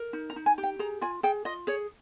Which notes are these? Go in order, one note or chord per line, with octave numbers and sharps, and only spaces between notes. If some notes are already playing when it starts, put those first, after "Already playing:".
Already playing: A#4
D#4
A#5
D#4
G#5
G4
G5
G#4 A#5
F4 G#5
G#4 G5
F4 D#5
G#4 C#5